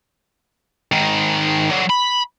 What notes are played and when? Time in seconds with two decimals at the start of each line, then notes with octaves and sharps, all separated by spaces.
0.92 G#2 D#3
1.71 D3 F#3
1.90 B5